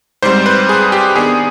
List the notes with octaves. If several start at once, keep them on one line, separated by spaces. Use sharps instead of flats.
G#2 G3 C4 C5
B4
G#4
G4
D#3 B3 D4 G#4